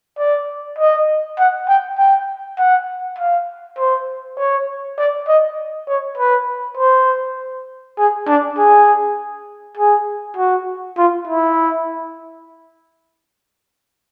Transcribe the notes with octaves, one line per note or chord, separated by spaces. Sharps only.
D5
D#5
F#5
G5
G5
F#5
F5
C5
C#5
D5
D#5
C#5
B4
C5
G#4
D4
G#4
G#4
F#4
F4
E4